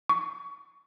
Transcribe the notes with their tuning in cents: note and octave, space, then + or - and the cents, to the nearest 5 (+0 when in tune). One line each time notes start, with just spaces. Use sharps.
C#6 +25